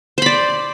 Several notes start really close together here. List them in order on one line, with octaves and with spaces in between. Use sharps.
C5 B5 D5